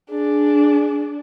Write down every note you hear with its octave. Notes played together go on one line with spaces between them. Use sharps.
D4 G#4